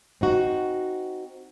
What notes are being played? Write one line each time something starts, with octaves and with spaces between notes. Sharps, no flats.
C4 D#4 F#4